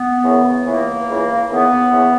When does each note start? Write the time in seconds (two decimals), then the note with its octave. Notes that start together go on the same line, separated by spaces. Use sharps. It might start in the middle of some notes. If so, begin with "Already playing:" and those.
Already playing: B3
0.24 F#2 C#3 E3
0.65 C#2 C#3 E3 A#3
1.07 C#2 C#3 E3
1.49 D#2 C#3 E3 B3
1.92 C#3 E3